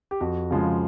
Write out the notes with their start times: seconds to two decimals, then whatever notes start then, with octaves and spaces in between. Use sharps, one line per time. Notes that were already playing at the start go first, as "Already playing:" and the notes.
0.11 G4
0.20 F2 F#4
0.51 C#3 F3 G#3